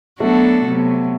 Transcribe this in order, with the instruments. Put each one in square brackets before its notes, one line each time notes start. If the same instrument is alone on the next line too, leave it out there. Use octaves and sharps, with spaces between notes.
[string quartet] F#3 B3 D4 F#4 A4 [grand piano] A3
[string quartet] C3 F#3 B3